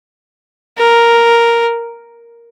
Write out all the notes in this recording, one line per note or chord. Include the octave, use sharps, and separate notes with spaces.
A#4